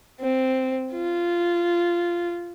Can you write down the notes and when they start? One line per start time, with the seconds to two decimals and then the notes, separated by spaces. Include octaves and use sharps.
0.20 C4
0.93 F4